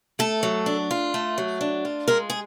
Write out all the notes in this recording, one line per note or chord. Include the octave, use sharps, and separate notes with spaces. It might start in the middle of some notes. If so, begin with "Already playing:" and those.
A3 A4
F#3
D4
F4
A3
F#3
D4
F4
G#3 A#4
G#4